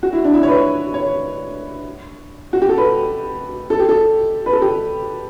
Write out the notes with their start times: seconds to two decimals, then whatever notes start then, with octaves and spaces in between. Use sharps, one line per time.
0.03 F#4
0.13 E4
0.24 D4
0.34 E4
0.43 C#5
0.48 B4
0.94 C#5
2.53 F#4
2.62 G4
2.69 A4
2.78 B4
3.70 A4
3.79 G4
3.89 A4
4.46 B4
4.53 A4
4.62 G4